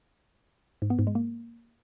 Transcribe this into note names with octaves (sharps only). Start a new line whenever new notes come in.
G#2
B3
G#2
G#3
A#3